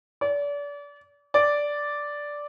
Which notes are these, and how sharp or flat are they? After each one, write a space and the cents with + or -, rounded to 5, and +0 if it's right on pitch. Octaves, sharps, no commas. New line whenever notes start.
D5 -35
D5 -5